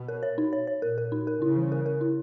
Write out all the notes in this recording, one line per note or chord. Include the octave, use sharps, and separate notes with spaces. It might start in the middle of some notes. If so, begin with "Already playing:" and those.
Already playing: B2
A#4
C#5
D#4
C#5
C#5
A#2 A#4
A#4
D#4
A#4
C#3 E4
E3
A#4
A#4
E4